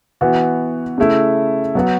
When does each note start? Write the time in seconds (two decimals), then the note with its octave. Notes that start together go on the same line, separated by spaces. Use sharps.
0.21 E3 B3 F#4
0.98 C#3 A3 E4
1.75 F#3 B3 F#4